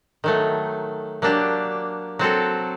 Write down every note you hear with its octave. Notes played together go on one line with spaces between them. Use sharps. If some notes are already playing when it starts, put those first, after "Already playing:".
D#3 F#3 A3
F#3 A#3 D4 G4
F#3 C4 F#4 A4